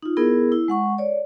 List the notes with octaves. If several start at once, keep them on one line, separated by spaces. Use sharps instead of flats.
D#4 F4
B3 E4 G#4 A#4
E4
G#3 F#5 C#6
C#5 D5